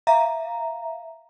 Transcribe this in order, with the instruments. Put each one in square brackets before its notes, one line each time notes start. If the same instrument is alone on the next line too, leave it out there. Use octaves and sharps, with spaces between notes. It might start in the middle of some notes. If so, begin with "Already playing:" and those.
[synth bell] E5 F5 A#5